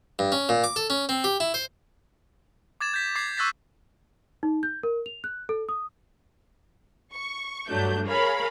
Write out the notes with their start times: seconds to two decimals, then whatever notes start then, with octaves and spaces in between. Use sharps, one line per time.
0.19 G2
0.32 C#4
0.49 A#2
0.64 D6
0.76 A4
0.90 C#4
1.09 C4
1.24 G4
1.40 E4
1.54 C5
2.81 D6 G#6 A6 E7
2.94 G6 B6
3.16 D6 G#6 A6 C7
3.37 C#6 E6 F#6 A6 B6
4.43 D#4
4.63 G6
4.83 A#4
5.06 F7
5.24 F#6
5.49 A4
5.69 D#6
7.12 C#6
7.69 G2 F#3 A3 D4 G6
8.07 G#4 A#4 C#5 F5 B5